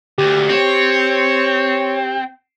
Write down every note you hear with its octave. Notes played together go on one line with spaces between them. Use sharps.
D2 G4
C4 C#5